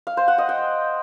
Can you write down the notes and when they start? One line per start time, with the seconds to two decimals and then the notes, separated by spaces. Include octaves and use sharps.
0.07 F5
0.17 C5
0.28 F#5
0.38 D#5
0.49 G5